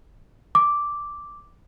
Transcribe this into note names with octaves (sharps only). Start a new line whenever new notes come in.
D6